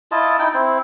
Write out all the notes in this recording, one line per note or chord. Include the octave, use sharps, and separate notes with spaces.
E4 F4 D#5 A5
D#4 E4 G5
C4 E4